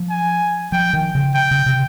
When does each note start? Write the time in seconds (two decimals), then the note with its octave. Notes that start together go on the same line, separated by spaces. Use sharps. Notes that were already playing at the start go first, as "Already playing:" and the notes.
Already playing: F3
0.10 G#5
0.72 F3 G5
0.93 D#3
1.15 C#3
1.35 G5
1.51 C#3
1.66 C3